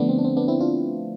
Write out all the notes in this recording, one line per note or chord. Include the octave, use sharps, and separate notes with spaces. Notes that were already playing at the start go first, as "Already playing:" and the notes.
Already playing: D3 F3 A3 B3 D4
C4
D4
C4
B3 D4
C4 E4
D4 F4